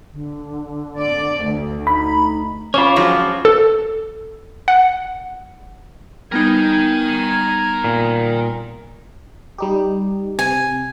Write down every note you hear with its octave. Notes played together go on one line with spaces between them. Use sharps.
D3
D5
D2
D#4 B5
C#4 F4 C5 C#5 B5 D6
F3 F#3 G#3
A4
F#5
G3 B3 D#4 A#4 G5 G#5
A#2
G3 D#4 G4
C3 G#5